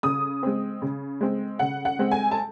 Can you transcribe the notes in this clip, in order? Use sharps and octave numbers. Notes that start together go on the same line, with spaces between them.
C#3 D#6
G#3 C4
C#3
G#3 C4
C#3 F#5
F#5
G#3 C4
G#5
A5